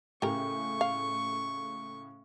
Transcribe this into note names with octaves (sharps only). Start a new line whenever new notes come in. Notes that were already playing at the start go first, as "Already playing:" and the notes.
A2 C#3 G4 A#4 C#6
F5